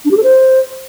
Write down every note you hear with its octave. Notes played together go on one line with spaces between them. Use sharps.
D4
G4
A4
C5